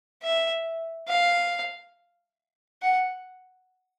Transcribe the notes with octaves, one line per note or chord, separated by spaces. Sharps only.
E5
F5
F#5